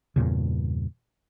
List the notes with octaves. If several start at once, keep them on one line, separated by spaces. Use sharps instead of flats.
E2 G2 A#2 C#3